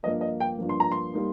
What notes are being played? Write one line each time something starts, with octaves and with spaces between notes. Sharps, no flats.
G2 F3 A#3 D#5
D#5
G5
G2 F3 A#3
C6
A#5
C6
G3 A#3 D#4